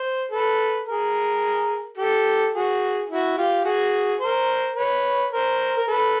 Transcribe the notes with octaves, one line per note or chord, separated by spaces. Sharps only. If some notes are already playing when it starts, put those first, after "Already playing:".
Already playing: C5
A4 B4
G#4 A#4
G4 A4
F#4 G#4
E4 F#4
F4 G4
F#4 G#4
A#4 C5
B4 C#5
A#4 C5
A#4
A4 B4